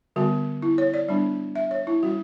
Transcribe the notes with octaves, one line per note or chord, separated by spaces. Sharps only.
D3 G3 B3 F#4
E4
C#5
D5
G3 B3 D4
E5
C#5
E4
G3 C#4 F#4